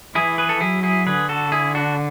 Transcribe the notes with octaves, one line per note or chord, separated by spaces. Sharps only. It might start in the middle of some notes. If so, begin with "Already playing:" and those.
E3 E4 G#4
G#4 B4
A4
F#3 E4 G#4
E4 G#4
D3 G#4 B4
F#4 A4
E4 G#4
D4 F#4